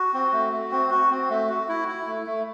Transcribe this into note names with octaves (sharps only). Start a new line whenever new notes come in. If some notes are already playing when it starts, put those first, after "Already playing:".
Already playing: F#4
C4
A3
A3
C4
F#4
C4
A3
F#4
E4
E4
A3
A3